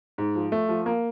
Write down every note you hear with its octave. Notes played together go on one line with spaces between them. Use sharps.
G#2
F3
A3
F3
A#3